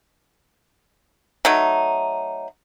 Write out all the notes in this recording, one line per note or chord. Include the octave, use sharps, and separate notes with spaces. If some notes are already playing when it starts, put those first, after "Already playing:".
F#3 A3 D#4